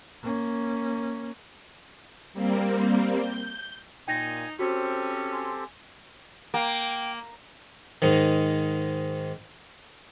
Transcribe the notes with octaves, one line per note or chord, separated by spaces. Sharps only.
A#3 C#4
G3 A#3 C4
G6
A#2 D#4 G5 G#5 A#6
C4 C#4 F#4 G4 A4 C5
G#5 C6
A#3 G5
G#2 D#3